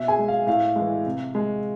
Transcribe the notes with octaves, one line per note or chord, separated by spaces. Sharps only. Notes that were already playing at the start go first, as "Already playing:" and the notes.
Already playing: B2 E5
G#4 G#5
G#3
F5
A2 F5
E3 G#3
C3
G#3